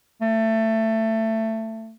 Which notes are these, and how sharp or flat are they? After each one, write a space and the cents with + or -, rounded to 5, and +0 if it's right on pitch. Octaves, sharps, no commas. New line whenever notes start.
A3 +20